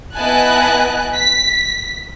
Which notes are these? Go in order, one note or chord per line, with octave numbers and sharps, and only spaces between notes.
B3 E4 D#5 G#5 A5 F#6
B6